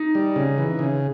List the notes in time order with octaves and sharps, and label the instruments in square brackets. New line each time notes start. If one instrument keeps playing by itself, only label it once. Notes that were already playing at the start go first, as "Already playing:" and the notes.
Already playing: [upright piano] D#4
[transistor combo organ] G3
C#3
E3
C#3